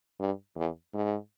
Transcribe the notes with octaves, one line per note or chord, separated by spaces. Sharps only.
G2
E2
G#2